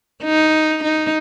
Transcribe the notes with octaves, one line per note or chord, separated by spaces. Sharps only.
D#4
D#4